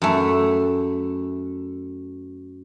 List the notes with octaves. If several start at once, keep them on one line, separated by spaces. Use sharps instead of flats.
F#2 A3